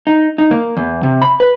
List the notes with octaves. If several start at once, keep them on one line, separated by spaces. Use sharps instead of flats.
D#4
D#4
A#3
E2
C3
B5
B4